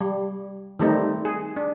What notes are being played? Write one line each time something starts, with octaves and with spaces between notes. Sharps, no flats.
G3
D#3 G3 A3 C4 D#4
G#4
D4